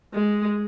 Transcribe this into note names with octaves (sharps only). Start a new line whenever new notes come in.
G#3